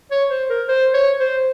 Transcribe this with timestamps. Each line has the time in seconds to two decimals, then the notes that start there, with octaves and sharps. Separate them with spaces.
0.11 C#5
0.30 C5
0.50 A#4
0.68 C5
0.94 C#5
1.20 C5